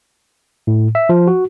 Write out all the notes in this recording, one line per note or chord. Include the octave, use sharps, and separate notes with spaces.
A2
E5
F3
F#4